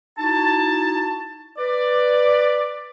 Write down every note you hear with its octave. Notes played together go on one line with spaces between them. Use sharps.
D#4 E4 F#4 A5
B4 D5